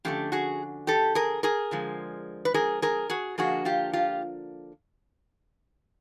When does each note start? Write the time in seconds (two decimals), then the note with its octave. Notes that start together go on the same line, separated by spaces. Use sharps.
0.05 D3 F3 A3 C#4 F4 G4
0.32 F#4 G#4
0.87 G4 A4
1.15 G#4 A#4
1.43 G#4 A#4
1.71 D3 F3 G#3
2.45 B4
2.54 G#4 A#4
2.82 G#4 A#4
3.10 F#4 G#4
3.38 D3 F3 A#3 D4 F#4 G#4
3.65 F4 G4
3.93 F4 G4